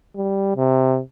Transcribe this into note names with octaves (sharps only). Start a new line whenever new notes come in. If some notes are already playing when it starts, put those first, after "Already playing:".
G3
C3